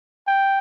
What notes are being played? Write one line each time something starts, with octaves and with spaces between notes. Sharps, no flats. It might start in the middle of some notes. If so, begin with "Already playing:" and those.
G5